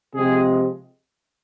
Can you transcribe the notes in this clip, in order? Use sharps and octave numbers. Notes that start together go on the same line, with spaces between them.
C3 F3 G#3 C4 G#4